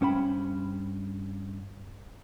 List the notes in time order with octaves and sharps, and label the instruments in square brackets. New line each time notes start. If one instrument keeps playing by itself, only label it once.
[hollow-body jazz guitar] G2 C#4 C5 G5 B5